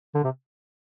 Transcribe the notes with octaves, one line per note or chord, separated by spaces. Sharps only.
D3
C3